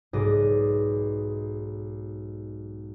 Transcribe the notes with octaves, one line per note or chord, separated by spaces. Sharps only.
B1 G#2 D5 D#5